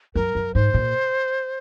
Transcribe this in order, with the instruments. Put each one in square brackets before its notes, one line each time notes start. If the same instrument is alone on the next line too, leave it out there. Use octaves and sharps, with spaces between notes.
[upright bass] F#2 [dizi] A#4
[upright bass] F#2
[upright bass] G#2 [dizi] C5
[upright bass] A#2